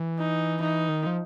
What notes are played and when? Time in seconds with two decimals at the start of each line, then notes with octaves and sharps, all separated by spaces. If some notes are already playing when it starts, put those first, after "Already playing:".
Already playing: E3
0.19 D#4
0.60 E3 D#4
0.89 D#3
1.06 F3